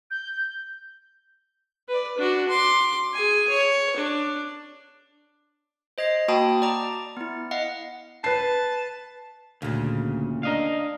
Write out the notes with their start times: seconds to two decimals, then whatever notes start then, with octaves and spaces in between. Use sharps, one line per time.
0.10 G6
1.88 B4 D5
2.18 D4 F#4
2.49 C6 D6
3.14 G#4 G#5
3.49 C#5
3.96 D4
5.98 C5 D#5 G#6 C7
6.28 A#3 F#4 G5 A5 B5 D#6
6.62 D5 A5 A#5 D6
7.17 B3 E4
7.51 D#5 F5 F#5
8.24 B4 A5 C7
9.62 D2 A#2 C#3
10.43 D4 A#4 D#5 F5